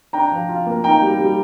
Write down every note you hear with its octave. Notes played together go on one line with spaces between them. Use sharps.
D4 G5 A#5
F3
F4
A#3
D#4 G5 A#5
G3
G3